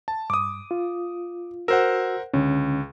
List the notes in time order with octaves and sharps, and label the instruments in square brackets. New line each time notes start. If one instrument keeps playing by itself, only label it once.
[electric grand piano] A5
[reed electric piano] G2 [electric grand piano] D6 D#6
[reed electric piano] F4
[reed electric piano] F#4 E6 [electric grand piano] A#4 C5 F#5
[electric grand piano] C#2 [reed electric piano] D3 C#4